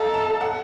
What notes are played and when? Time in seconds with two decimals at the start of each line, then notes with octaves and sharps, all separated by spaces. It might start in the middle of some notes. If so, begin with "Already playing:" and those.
Already playing: A4 D#5 F5 A#5
0.14 A5
0.41 F#5